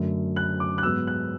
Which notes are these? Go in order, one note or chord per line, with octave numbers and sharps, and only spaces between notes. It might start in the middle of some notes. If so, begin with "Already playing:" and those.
Already playing: F#2 D3 A3
F#6
D6
F#6
G#2 F#3 B3 E6
F#6